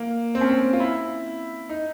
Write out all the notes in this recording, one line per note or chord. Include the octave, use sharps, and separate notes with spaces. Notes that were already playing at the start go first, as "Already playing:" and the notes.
Already playing: A#3
C4
C#4
C4
F4
E4
D#4